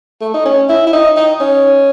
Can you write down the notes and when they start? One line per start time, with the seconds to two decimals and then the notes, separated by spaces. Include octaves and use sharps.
0.21 A3
0.34 D#4
0.45 C#4
0.69 E4
0.87 E4
0.93 D#4
1.17 D#4
1.40 C#4